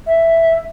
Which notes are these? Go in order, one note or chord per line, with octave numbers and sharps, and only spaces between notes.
E5